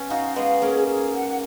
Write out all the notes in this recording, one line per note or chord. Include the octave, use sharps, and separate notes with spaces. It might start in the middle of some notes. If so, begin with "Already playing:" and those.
Already playing: B3 C#4
D#4 F#4 F5
G#3 B3 F5
A#3 C#4 G#4
G#4
F#5